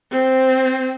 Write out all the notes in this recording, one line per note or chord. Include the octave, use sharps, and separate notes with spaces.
C4